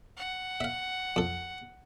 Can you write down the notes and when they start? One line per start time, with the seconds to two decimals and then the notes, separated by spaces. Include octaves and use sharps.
0.17 F#5
0.60 E5 F5
1.16 F2 A4